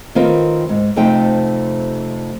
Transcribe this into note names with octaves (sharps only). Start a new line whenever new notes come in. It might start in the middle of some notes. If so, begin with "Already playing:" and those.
D#3 C4 F4 A#4 B4
G#2
F2 C3 A3 D#4 C5 G5